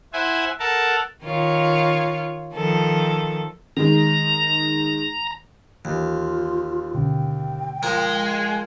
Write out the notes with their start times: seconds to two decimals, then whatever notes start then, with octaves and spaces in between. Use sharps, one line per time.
0.13 E4 C5 E5 F#5 G#5
0.60 A4 A#4 F#5 A5
1.24 D#3 F4 C#5
2.54 D#3 F3 A4
3.77 D#3 G#3 A#5
5.85 D#2 E3 F4
6.94 B2 D3 C#4 G5
7.83 F3 G#3 A#4